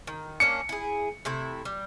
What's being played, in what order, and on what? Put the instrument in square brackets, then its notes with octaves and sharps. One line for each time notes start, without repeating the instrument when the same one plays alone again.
[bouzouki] D#3
[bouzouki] A#3 C#4 D4 [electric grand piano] C#7
[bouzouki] E4 G#4
C3 A3 E4
G3